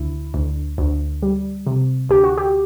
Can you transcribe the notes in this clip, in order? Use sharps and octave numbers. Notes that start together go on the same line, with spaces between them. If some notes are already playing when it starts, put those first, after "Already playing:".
Already playing: D2 E4
D2
D2
G3
C3
D2 G4
F#4
G4